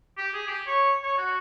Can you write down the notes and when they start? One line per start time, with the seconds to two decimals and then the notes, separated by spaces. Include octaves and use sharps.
0.17 G4
0.34 G#4
0.48 G4
0.67 C#5
1.03 C#5
1.18 F#4